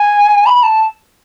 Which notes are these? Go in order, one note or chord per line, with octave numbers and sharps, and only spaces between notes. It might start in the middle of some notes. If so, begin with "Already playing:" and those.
Already playing: G#5
B5
A5